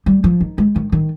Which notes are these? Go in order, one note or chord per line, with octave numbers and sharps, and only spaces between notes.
G3
F3
D#3
G#3
D#3
D#3